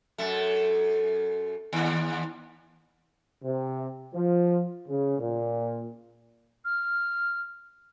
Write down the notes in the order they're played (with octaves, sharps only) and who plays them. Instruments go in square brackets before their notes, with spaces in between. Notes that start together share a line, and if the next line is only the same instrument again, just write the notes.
[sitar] F#2 A3
D#2
[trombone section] C3
F3
C#3
A#2
[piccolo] F6